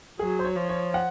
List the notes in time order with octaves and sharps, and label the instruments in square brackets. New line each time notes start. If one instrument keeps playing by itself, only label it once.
[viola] F#3 [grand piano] G#4
[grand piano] C5
C#5
[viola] F3
[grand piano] C#5
F#5